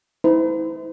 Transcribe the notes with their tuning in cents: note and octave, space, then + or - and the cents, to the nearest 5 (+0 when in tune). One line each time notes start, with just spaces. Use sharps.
E4 -35 C5 -45